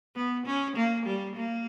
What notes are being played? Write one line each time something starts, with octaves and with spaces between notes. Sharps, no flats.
B3
C#4
A#3
G3
A#3